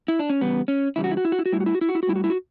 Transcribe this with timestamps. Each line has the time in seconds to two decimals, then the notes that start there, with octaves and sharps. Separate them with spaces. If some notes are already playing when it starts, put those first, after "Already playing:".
0.08 E4
0.19 D4
0.30 C#4
0.41 E2 C#3 G3 B3
0.68 C#4
0.96 E2 C#3 G3 E4
1.04 F#4
1.11 E4
1.17 F#4
1.25 E4
1.32 F#4
1.39 E4
1.46 F#4
1.52 A2 G3 E4
1.60 F#4
1.66 E4
1.75 F#4
1.81 E4
1.89 F#4
1.95 E4
2.03 F#4
2.07 A2 G3 E4
2.16 F#4
2.24 E4
2.30 F#4